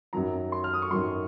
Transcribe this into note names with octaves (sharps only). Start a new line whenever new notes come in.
F#2 D#3 F#3 A#5
C6
F6
D#6
C#6
F#2 D#3 F#3 C6